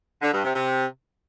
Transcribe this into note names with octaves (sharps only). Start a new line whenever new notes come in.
D3
G2
C3
C3